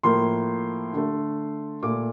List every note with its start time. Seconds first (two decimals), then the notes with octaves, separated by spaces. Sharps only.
0.03 A2 F3 A#3 C6
0.93 D3 A3
1.83 A#2 A3 D6